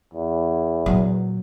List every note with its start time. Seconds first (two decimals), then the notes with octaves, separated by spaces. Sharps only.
0.13 E2
0.86 A#2 F#3